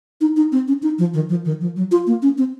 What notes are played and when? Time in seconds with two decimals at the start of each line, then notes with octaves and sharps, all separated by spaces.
0.21 D#4
0.36 D#4
0.52 C4
0.68 C#4
0.83 D#4
0.98 F3
1.14 D#3
1.29 F3
1.45 D#3
1.61 F3
1.76 F#3
1.91 F4
2.07 A#3
2.22 C#4
2.38 C4